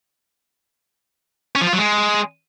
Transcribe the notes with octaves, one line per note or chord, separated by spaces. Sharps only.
C#4
F3
F4
F#3
G#3